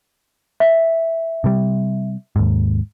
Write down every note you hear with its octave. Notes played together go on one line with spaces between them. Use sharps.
E5
C3 G3
D#2 G#2